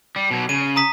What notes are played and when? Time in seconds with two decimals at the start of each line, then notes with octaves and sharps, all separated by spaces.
0.16 G3
0.31 B2 F#3
0.49 C#3 D#7
0.76 A#5 D#6 B6